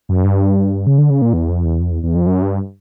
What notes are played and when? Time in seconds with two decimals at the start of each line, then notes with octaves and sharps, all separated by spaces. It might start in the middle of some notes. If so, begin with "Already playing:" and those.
0.09 F#2
0.24 G2
0.87 C#3
0.98 D3
1.10 C#3
1.22 A#2
1.33 E2
1.49 F2
1.65 E2
1.80 F2
1.92 E2
2.03 E2
2.15 F2
2.27 F#2
2.42 G2